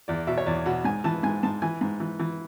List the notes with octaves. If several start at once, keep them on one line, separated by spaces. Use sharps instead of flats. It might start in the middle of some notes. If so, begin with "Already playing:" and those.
E2 D5
B2 E5
C#5
E2 D5
B2 F#5
G#2 G#5
E3 A5
G#2 G#5
G#2 A5
E3 G#5
G#2
E3
E3